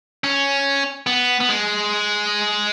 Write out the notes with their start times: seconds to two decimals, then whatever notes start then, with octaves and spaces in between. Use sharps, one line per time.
0.24 C#4
1.07 B3
1.40 B3
1.49 G#3